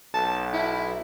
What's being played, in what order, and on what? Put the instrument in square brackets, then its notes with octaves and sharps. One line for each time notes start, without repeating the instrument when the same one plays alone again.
[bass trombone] B1 [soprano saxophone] A5
[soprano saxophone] E4